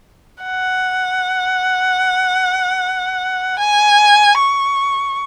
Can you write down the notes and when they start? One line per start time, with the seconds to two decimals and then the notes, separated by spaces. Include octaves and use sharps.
0.44 F#5
3.59 G#5
4.39 C#6